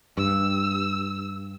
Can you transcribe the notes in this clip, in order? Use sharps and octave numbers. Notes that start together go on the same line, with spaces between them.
G2 E6